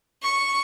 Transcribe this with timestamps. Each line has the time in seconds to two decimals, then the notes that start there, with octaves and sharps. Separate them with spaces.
0.22 C#6